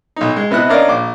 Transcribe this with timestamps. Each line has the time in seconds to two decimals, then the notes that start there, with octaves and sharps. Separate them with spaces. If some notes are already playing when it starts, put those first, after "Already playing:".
0.16 B1 D#4
0.36 G#3
0.51 C3 B3 E4 D#5 F#6
0.69 C#4 D4 A#4 D5 D#5 F5
0.88 A#1 D6